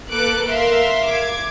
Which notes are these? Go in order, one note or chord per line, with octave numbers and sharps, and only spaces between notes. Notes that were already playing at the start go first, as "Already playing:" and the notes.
A#3 A4 B4 D6 F#6 D7
A#4 E5 F5 C6
D6 G#6